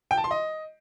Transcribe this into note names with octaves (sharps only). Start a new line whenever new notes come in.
G5
A5
C6
D#5